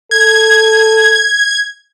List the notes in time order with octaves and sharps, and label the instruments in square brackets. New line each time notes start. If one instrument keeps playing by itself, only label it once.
[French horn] A4 [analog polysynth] G#6